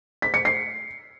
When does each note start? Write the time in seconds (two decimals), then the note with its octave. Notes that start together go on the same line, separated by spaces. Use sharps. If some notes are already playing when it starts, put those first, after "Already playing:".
0.22 B6
0.34 C#7
0.45 C7